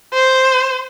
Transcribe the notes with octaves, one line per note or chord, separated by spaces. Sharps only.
C5